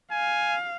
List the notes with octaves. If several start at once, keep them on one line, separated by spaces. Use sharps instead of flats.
F5 G#5